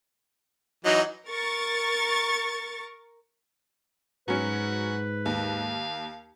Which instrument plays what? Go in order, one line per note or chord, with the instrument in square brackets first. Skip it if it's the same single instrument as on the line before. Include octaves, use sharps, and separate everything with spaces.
[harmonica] E3 F#3 D#4 [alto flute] D#5
[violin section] A#4 C#6 A6
[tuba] G#2 [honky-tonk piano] F#3 C#4 [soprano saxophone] F#4 [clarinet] B4
[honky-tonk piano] D#2 [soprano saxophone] F5